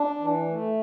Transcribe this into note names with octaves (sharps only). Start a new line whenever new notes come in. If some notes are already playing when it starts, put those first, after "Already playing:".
Already playing: D4
E3
A3